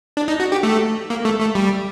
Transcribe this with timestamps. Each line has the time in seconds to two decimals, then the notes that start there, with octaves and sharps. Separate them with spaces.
0.17 D4
0.28 D#4
0.40 F#4
0.52 G4
0.63 A3
1.10 A#3
1.25 A3
1.40 A3
1.55 G3